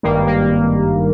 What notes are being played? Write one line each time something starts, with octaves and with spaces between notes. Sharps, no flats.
G#1 G2 D#3 G3 A#3
A#3